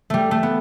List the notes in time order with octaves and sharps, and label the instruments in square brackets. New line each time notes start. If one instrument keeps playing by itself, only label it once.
[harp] G3 A3
A3
B3